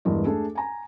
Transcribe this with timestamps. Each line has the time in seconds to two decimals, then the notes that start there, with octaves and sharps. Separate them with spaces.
0.05 E2 G2 E3 G#3 A#4 D#5
0.25 A3 D4 G#4 A4
0.55 G#5 A#5